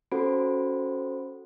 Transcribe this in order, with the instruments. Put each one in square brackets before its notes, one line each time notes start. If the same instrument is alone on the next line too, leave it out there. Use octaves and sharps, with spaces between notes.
[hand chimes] C#4 F#4 A4 C5 B5 D7